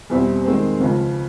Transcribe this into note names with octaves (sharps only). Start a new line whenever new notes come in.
E2 B2 G3 C4 E4
D#3 G#3 C4
C#2 C#3 F3